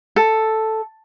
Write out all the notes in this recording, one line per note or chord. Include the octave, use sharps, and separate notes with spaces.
A4